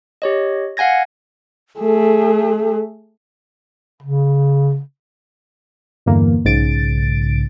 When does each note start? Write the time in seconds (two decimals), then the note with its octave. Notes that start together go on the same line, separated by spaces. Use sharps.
0.22 G4 C#5 D#5
0.77 F5 F#5 G#5 G#6 A#6
1.80 A3 G#4 A4
4.03 C#3
6.06 E2 G2 D3 E3 A#3
6.45 B1 G#2 C#3 A6 D7